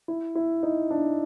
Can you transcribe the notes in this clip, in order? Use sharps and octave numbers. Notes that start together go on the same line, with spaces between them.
E4
E4
D#4
D4